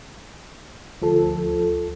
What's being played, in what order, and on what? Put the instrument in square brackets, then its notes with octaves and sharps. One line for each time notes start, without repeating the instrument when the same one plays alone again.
[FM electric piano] D2 F3 A4